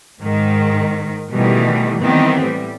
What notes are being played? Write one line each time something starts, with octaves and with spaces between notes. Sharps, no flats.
G#2 D#3
B2 D#3 E3 G3 A3
D#3 E3 G3 B3 C4
A2 G3